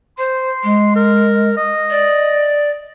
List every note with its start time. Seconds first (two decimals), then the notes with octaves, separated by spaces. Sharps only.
0.18 C5 C6
0.63 G#3
0.95 A#4
1.57 D#5
1.90 D5